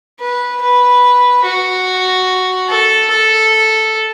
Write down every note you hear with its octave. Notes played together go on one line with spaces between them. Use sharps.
B4
B4
F#4
A4
A4